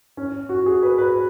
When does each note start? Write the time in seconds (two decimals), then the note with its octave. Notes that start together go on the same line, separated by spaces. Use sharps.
0.17 C#4
0.49 F#4
0.66 G#4
0.83 B4
0.98 B4